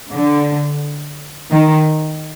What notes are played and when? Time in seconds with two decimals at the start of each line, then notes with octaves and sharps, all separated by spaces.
0.13 D3
1.51 D#3